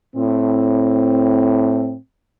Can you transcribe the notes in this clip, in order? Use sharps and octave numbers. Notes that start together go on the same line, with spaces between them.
A2 C4